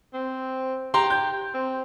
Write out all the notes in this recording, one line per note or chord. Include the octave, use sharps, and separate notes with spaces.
C4
G4 A#5 C6
G6
C4